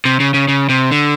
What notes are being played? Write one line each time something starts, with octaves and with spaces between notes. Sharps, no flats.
C3
C#3
C#3
C#3
C3
D3